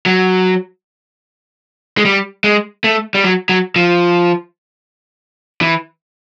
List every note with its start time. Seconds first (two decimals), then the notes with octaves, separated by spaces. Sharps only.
0.06 F#3
1.97 G#3
2.05 G3
2.44 G#3
2.84 A3
3.15 G3
3.24 F#3
3.49 F#3
3.76 F3
5.61 E3